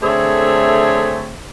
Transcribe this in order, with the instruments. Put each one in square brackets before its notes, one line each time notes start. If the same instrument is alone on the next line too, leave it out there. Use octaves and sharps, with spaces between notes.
[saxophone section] D3 A3 C4 G#4 C#5 E5